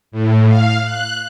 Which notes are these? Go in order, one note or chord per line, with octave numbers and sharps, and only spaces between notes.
A2
F5
F#6